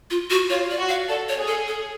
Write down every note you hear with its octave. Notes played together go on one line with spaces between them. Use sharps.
F4
F#4
F4 C#5
D5
F#4
F5
A4 D5
C#5
G#4
A4
A4